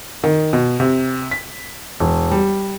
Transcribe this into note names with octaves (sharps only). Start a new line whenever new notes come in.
D#3
B2
C3
B6
E1
G3